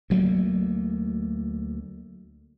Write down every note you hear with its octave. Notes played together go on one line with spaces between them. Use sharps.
D2 F#3 A3 A#3